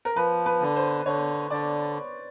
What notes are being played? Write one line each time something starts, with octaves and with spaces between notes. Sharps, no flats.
A#4
F3 B4
B4
D3
C5
D3 C#5
D3 D5